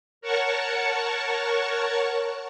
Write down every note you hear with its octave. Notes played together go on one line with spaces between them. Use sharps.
A#4 C#5 F#5 A5 C#6